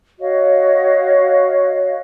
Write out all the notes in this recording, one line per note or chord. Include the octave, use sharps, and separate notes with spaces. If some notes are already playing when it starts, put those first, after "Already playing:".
F#4 C#5 D#5 F5